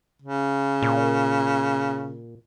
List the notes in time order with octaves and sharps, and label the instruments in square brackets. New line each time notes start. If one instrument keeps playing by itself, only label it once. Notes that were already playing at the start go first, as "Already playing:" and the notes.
[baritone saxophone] C#3
[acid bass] A#2